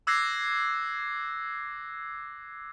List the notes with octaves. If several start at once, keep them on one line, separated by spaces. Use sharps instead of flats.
D6 E6 F#6 G#6 A#6 C7